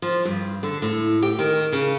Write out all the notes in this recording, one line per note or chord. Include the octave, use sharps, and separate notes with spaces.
F3
G2
D3
A2
G4
D#3
C#3